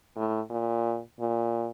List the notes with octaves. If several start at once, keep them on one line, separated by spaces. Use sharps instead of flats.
A2
A#2
A#2